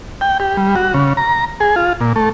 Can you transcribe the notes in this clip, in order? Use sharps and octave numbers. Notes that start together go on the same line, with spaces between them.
G5
G4
G3
F#4
C#3
A#5
G#4
F4
A#2
A3